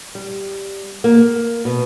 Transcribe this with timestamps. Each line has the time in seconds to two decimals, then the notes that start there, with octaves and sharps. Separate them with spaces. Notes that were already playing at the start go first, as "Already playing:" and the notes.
0.15 G3
1.04 A#3
1.65 B2